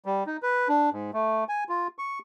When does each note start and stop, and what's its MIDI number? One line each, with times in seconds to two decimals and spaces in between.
0.06 0.24 55
0.26 0.37 63
0.43 0.68 71
0.69 0.90 62
0.93 1.11 44
1.14 1.44 57
1.49 1.64 80
1.69 1.88 65
1.99 2.19 85